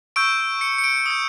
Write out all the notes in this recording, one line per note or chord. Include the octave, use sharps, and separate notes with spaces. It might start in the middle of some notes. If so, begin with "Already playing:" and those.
C#6 E6 G6 D7
C#7
C#7
D7
D#6 G6